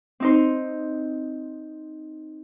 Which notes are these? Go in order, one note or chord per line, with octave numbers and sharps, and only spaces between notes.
C4 D#4 C5